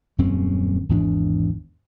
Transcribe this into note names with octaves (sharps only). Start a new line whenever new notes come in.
D#1 F#2 C4 C#4
G#1 E2 C#4 D4